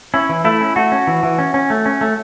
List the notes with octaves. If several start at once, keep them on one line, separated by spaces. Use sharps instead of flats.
C#4 E4
E3
A3 E4
C#4
A3 F#4
C#4
E3
E3
C#4
C#4
A3
C#4
A3